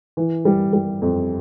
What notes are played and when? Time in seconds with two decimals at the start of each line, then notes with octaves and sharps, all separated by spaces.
0.17 E3
0.45 G3
0.73 G3
1.02 F2